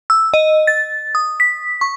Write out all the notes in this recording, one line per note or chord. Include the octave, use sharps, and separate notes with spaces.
E6
D#5
A6
D#6
B6
C#6